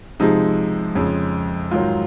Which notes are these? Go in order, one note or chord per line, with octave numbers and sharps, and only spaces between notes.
C3 F3 G#3 D#4
F2 C#3 G#3
G#2 D#3 F#3 F4